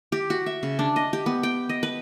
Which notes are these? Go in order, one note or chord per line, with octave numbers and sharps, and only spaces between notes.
G4
F#4
E5
C#3
D4
D#5
G4
B3
G5
D#5
B4